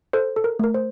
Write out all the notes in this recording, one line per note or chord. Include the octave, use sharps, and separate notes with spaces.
A4 C5
A4
A#4
A3 A#4
C5